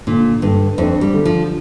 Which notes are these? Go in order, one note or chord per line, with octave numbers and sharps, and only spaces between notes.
A#2 D3
G2 D3
F2 D4
G3
D3
F3